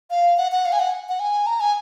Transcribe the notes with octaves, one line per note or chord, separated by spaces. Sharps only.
F5
F#5
F#5
F5
G#5
F#5
F#5
G#5
A#5
G#5